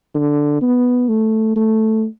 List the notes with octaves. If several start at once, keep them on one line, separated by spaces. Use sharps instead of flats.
D3
B3
A3
A3